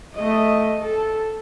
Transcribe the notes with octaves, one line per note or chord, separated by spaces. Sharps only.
A3 D#5
A4